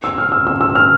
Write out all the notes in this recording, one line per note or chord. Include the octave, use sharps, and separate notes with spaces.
E6
F6
E6
E6
E6
F6